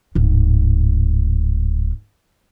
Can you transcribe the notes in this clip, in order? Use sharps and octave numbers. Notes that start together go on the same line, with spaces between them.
D1 G#2